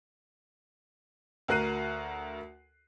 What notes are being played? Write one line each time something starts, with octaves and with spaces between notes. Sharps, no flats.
D2 F#4 A#4 F#6 C7 D#7